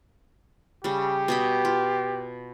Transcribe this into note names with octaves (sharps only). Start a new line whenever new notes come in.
C#3 G3 G4
B2 D#5 B5
F4